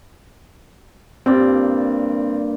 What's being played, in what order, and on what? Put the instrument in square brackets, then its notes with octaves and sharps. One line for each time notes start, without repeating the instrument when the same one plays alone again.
[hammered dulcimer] G2 A#2 D5 [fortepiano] C4